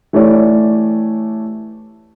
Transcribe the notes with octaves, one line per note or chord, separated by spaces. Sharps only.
E3 A3 G4 C#5 D5